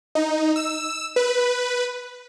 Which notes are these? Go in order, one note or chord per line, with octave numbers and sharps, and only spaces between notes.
D#4
E6
B4